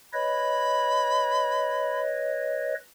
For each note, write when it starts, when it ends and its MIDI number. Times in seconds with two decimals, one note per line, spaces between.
0.13 2.74 71
0.13 2.74 73
0.13 2.74 75
0.13 2.01 83